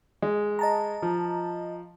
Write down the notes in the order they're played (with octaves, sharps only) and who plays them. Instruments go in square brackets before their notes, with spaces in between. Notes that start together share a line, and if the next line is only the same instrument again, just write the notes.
[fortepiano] G#3
[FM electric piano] D#5 A5 A#5
[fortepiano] F3